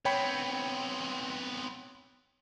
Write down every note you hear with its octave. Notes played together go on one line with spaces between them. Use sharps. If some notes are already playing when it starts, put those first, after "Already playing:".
B3 C4 C#5 G5 B5